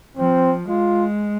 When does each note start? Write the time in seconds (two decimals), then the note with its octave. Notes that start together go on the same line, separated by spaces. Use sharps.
0.17 F3 C4
0.69 G#3 F4